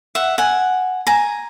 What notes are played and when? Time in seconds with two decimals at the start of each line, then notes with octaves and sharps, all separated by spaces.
0.15 E5 F#5
0.38 F#5 G#5
1.07 G#5 A#5